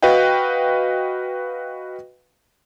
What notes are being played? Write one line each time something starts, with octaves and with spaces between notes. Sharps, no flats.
F#4 B4 D#5 F5 G5